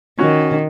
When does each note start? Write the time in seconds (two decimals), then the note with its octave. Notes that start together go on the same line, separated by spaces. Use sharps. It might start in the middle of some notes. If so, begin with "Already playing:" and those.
0.19 D#3 C#4 F#4